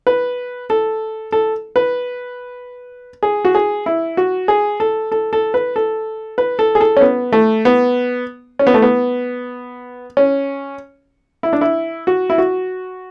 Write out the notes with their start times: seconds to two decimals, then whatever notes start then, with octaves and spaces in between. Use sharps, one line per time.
0.07 B4
0.70 A4
1.32 A4
1.76 B4
3.23 G#4
3.45 F#4
3.55 G#4
3.86 E4
4.17 F#4
4.48 G#4
4.80 A4
5.12 A4
5.33 A4
5.54 B4
5.76 A4
6.38 B4
6.59 A4
6.75 G#4
6.81 A4
6.97 C#4
7.01 B3
7.32 A3
7.65 B3
8.59 C#4
8.67 B3
8.74 A3
8.82 B3
10.17 C#4
11.43 E4
11.53 D4
11.61 E4
12.07 F#4
12.30 E4
12.38 F#4